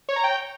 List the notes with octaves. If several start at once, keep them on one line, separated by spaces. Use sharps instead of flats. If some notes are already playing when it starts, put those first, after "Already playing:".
C#5
A#5
G5